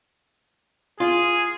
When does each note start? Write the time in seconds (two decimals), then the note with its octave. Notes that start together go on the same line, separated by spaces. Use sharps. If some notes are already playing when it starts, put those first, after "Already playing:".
1.00 F4 G#4